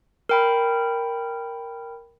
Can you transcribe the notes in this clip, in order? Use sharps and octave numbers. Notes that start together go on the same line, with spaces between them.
A#4 G5 B5